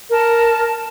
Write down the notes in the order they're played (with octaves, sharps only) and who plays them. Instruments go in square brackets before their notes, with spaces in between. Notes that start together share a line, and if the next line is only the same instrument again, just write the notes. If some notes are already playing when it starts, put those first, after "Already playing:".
[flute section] A#4 A5